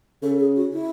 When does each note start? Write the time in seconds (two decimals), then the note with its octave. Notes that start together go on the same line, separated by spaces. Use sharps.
0.22 C#3 A4
0.39 G#4
0.56 F#4
0.73 E4